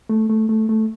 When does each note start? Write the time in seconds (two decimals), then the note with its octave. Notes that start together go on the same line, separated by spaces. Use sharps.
0.09 A3
0.29 A3
0.49 A3
0.69 A3